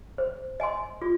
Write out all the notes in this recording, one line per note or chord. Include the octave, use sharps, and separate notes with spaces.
C5
D#5 G#5 C6
F4